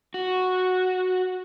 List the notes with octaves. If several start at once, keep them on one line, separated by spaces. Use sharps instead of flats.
F#4